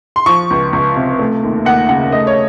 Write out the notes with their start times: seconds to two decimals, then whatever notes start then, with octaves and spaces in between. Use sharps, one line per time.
0.16 C6
0.26 F3 C#6
0.50 C#2
0.73 C#2
0.96 C3
1.19 A3
1.43 D#2
1.65 D#2 F#5
1.89 C#3 F#5
2.12 A3 D#5
2.27 C#5